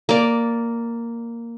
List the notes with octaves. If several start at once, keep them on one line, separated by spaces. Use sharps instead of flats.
A#3 D5